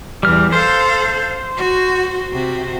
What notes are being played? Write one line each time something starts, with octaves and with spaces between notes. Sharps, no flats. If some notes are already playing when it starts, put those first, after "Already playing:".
E2 E3 G3 F6
A4 C5 F5
F#4
C3 F#4